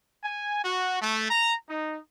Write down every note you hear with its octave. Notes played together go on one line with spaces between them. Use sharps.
G#5
F#4
A3
A#5
D#4